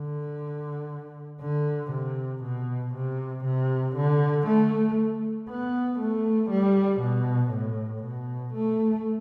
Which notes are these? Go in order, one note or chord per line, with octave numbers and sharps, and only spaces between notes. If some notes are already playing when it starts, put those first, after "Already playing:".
Already playing: D3
D3
C3
B2
C3
C3
D3
A3
B3
A3
G3
B2
A2
B2
A3